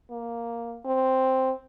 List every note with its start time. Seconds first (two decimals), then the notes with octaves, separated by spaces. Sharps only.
0.11 A#3
0.85 C4